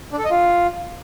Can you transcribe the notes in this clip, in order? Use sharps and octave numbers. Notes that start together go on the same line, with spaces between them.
D4
A4
D#5
F4